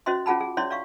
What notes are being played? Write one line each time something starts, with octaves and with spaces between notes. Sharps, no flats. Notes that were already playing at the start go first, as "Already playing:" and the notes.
C#4 F#4 C5 D#5 E5 C6
C#4 F4 G#4 F#5 A5 B5
G#4
C#4 E4 C#5 D5 E5 C6
D5 E5 F5 C#6